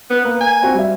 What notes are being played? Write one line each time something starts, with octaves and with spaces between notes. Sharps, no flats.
B3
A#3 B4
G#5
C4 F#4
G3 E5